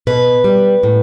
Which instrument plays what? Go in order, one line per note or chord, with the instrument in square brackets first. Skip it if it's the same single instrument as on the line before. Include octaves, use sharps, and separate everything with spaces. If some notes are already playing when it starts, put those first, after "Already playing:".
[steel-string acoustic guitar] B2 B4
G3
A2